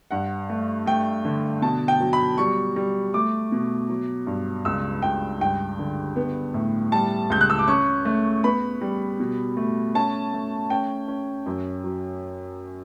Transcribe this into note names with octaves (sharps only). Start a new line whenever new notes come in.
G2 F#5
A3
A3 G5
D3
B2 A5
G5
F#3
B5
G3 C#6
G3
A3 D6
B2
F#3
G2
C#2 E6
C#2 G5
G2 G5
D3
B3
A2
G3 A5
C#2 G6
F#6
E6
D6
C#4 C#6
A3
B3 B5
G3
B2
A3
C#4 A5
A3
C#4 G5
C#4
F#2
F#3